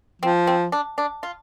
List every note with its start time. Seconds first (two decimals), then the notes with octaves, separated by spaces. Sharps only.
0.22 F3 C4
0.47 C4
0.72 D4
0.98 D4
1.23 F4